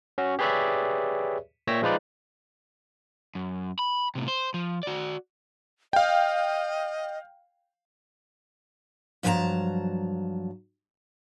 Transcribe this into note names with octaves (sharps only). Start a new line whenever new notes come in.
C#4 F#4
G4 G#4 B4 C#5 D5 E5
A#2 C#5 E5 G5 E6 A#6
F3 G#3 D#4 F4 B4 D5
F#2
B5
A2 C3
C5
F3
F#4 D5
D#5 F5 G5
G2 F3 F#3 F#5 A5 A#5